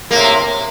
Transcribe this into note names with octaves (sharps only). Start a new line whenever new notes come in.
A2 C3 A#3